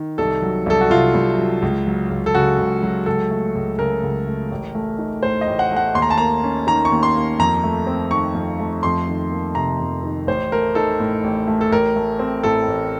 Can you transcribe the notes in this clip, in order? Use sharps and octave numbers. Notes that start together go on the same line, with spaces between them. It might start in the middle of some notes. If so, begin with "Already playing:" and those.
Already playing: D#3
C2 A4
F#3
C2 A4
F#4
C3 F4
C2
F#3
C#2
F#3
C#2
A4
C#3 F#4
C#2
F#3
C#2 A4
A3
C#2
C#3 A#4
C#2
A3
A1
A3
D#4
A2 C5
D#5
A1
F#5
A3
F#5
D#2 C6
A#5
A5
A#3 A#5
C#4
D#3 A#5
C#6
D#2
C6
A#3
F2 A#5
A3
C4
D#3 C#6
F2
A3
F2 C6
D#3
A#3
C3 A#5
F2
D#3
A1 C5
A3 A#4
D#4 A4
A2
A1
A3
A4
A1 A#4
A3
C4
A2 A4
A1